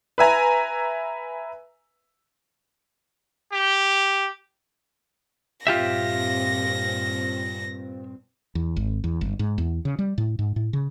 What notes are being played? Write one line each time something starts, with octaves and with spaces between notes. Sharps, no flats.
B4 E5 G#5 A#5
G4
G2 A#2 C4 F4 G4 E5 A#6
E2
G#1
E2
G1
G#2
E2
C#3
G3
A2
G#2
A2
C#3